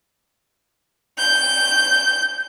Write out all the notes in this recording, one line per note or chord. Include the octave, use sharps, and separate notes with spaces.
G6